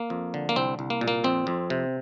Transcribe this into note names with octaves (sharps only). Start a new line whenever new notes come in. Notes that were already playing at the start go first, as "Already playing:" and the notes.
Already playing: A#3
F2
D3
A#3
C2 C4
C2
A#3
A#2
A#3
F2 C4
F2
C3